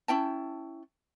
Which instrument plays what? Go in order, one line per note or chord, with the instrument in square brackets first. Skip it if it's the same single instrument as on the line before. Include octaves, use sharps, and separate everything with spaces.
[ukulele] C#4 E4 G5 A5